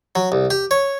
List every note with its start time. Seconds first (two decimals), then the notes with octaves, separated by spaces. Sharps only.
0.15 F#3
0.32 C2
0.50 G4
0.71 C#5